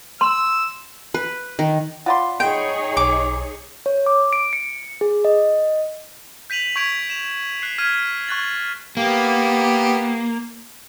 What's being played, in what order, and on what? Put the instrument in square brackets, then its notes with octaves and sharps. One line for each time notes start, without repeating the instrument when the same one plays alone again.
[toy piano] C6 [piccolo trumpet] E6
[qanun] B4
D#3
[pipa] F4 D5 C6 [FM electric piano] F#5 B5
[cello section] D#4 G#4 C#5 [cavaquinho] G5
[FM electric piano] B1 [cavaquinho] D6
[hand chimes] C#5
D6
D7
C#7
G#4
D#5
[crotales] G6 B6 D#7 F7 F#7
C#6 G6 G#6 B6 D7 F7
E7 F7
F#6 C7
F6 G#6 B6 D#7
C#6 F#6 A6 F#7
[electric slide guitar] A#3 [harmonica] B3 G4